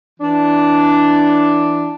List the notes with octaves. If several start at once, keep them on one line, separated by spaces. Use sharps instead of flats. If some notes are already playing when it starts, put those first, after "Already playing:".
E3 D4